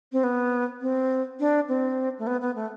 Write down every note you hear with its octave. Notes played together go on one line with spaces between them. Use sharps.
C4
B3
C4
D4
C4
A3
B3
B3
A3